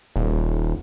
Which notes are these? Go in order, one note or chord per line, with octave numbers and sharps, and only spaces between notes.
D#1